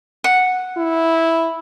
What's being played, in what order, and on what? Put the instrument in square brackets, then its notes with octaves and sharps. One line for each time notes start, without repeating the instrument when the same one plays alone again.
[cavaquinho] F#5
[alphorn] E4